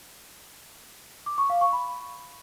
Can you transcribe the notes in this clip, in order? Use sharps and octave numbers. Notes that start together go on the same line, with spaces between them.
D6
C#6
F5
C#6
B5